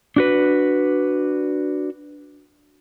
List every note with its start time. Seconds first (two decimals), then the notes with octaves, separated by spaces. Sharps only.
0.16 D4 F#4 B4